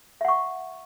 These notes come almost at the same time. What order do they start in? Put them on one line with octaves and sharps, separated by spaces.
E5 F#5 C#6